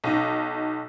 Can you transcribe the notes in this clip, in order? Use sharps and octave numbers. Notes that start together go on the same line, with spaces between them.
B1 D#4